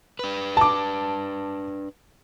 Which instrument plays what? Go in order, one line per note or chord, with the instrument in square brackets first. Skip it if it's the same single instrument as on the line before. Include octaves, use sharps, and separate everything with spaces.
[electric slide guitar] D4 B4
[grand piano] A5 D6